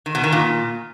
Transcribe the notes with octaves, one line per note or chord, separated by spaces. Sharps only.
D#3
B2
D#3
A#2